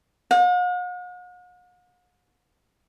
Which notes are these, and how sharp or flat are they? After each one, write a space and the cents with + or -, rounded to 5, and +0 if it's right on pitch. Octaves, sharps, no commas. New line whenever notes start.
F#5 -45